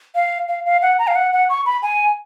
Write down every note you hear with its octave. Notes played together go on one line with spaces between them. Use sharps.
F5
F5
F5
F#5
A#5
F5
F#5
F#5
C#6
B5
G#5